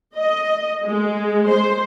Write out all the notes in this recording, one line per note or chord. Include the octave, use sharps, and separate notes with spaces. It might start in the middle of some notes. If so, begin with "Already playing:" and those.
D#5
G#3
C5